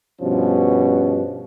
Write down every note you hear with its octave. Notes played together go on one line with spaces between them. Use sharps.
G2 B2 F3 C#4